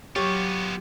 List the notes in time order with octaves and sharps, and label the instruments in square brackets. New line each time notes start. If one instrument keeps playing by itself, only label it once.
[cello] F#3 [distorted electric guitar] B3 F4 [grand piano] G4 [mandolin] C#5